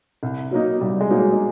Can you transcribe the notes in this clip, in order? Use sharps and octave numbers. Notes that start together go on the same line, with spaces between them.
C2
B2 F#3 A#3 D#4
C2 G3
G#3
B2 F#3 A#3 D#4
G#3